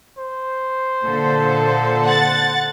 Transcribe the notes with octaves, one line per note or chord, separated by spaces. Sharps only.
C5
A#2 D3 A4
F#5 A6